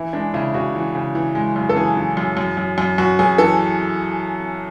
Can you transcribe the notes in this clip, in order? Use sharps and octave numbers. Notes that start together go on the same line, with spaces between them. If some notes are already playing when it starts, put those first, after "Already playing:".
Already playing: E3 E4
G#3 D4
C#3 E4
C#3 F#4
E3
C#3
E3
G#3
F#2
A4
E3 G#4
E3
F#2
F#2
F#2
F#2
F#2 F#4
F#2 G#4
E3 A4